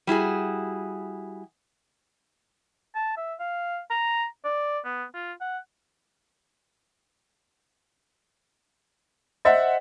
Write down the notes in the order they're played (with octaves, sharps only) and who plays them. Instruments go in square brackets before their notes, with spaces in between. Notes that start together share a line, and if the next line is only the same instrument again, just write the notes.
[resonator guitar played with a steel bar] G3 E4 F#4 G#4
[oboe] A5
E5
F5
A#5
D5
B3
F4
F#5
[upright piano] C5 E5 F#5 [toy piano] D#5